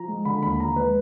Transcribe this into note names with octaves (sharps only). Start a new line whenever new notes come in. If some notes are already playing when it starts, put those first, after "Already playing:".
Already playing: F3 A#5
G#3
D3 B5
D#2 B5
F3 A#5
G#3 B4